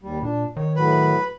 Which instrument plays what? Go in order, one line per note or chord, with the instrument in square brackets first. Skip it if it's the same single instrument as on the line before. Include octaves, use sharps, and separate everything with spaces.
[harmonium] D#2 G3
[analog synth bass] A#2 [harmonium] D4
[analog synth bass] D#3 [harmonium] C#5
[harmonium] A2 F#3 [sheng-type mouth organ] B4